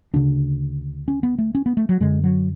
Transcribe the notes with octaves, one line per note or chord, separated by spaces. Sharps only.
D2 C#3 D4
C#4
B3
A3
C#4
B3
A3
F#3
F#2 D3 G#3
F#3